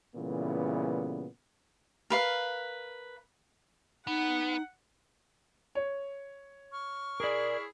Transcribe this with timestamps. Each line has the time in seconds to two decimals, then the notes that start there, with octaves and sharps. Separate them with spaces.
0.15 A#2 C#3 E3 G3 A3 B3
2.10 A#4 B4 F5
4.07 B3 D#4 F#5
5.75 C#5
6.72 C#6 F6
7.20 E4 G#4 A#4 D5